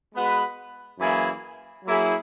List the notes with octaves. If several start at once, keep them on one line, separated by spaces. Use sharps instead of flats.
G#3 B3 F#4 B4
F#2 E3 A#3 E4 G#4
F#3 A#3 E4 G#4